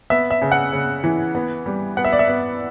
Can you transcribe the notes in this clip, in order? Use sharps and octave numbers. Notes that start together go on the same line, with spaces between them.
B3 E5
E5
C#3
F#5
C#3
E3
B3
G3
B3 F#5
E5
D5
E5
B3